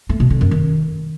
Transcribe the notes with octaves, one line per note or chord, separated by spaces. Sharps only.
A3
B2
D3
F#2
D#3